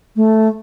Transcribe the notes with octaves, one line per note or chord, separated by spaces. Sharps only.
A3